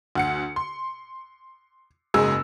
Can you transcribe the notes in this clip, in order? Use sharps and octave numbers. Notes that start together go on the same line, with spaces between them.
D2 F#5 C#7
C6
F#1 G#2 G#4 E6